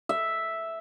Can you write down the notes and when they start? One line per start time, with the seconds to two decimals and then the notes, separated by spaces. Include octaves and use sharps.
0.09 E5